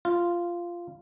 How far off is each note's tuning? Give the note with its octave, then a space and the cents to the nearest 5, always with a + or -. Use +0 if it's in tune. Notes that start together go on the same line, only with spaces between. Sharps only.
F4 -10